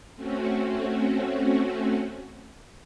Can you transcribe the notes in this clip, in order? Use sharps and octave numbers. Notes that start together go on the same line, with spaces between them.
A3 C4 C#4 F#4